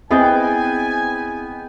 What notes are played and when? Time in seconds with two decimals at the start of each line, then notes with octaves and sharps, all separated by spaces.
0.11 B3 C4 E4 G#4 B4 D#5 G5 G#5